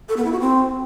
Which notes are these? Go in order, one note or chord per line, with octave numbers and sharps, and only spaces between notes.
A4
B3
E4
F#4
C4